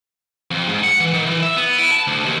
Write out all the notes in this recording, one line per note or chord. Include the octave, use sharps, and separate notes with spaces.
F2
G#2
F#5
E3
D#3
E3
E5
B3
E4
A5
D2
D#2